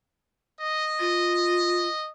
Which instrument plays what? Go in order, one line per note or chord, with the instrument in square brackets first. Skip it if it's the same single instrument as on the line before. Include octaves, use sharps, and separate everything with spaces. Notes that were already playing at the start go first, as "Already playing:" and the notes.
[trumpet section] D#5
[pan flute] F4